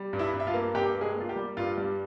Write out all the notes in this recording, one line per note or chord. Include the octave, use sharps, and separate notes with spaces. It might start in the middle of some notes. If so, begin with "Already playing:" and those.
Already playing: G3
G2
E4 E5
G2
E5
F4 F5
A#3
G2 G4 G5
A#3
G#3 G#4
A#3 F4
G4
G3
G2 F4
G3